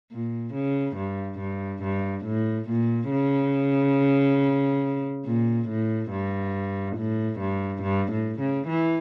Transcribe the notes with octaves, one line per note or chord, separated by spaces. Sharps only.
A#2
C#3
G2
G2
G2
A2
A#2
C#3
A#2
A2
G2
A2
G2
G2
A2
C#3
E3